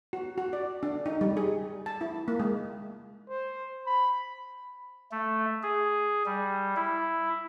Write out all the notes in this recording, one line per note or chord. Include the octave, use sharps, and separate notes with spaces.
F#4
F#4
D5
D4
D#4
G3
G#4
A5
E4
A#3
G#3
C5
B5
A3
G#4
G3
E4